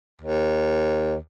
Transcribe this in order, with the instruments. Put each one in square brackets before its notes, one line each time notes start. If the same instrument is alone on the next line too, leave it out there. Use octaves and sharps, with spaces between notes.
[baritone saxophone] D#2